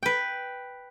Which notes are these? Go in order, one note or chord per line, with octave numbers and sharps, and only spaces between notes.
B4 G5